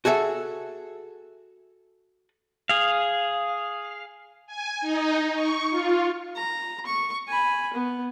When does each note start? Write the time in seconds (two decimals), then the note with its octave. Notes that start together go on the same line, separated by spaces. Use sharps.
0.05 F#4 G#4 A4 E5
2.69 G#4 F5
4.47 G#5
4.81 D#4
5.34 C#6
5.70 F4
6.36 A#5
6.86 C#6
7.28 G#5 B5
7.74 B3